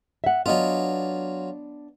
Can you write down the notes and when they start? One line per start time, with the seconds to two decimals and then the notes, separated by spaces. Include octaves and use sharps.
0.24 E5 F#5
0.46 F#3 B3 D4 F4 D#5